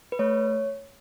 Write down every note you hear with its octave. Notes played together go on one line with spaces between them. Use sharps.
B4
A3 C#5